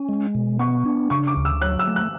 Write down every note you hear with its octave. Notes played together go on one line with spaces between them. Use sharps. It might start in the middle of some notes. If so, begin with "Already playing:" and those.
Already playing: C#4
G#3
B2
B3 C#6
D4
C#3 C#6
D6
D2
E6
F#3 F#6
E6
A3
F#6